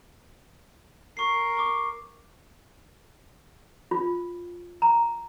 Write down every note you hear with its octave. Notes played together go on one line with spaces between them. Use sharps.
A#4 C#6 C7
C#6 D6
F4
A#5